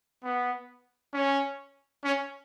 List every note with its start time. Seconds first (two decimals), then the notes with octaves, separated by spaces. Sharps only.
0.24 B3
1.14 C#4
2.04 C#4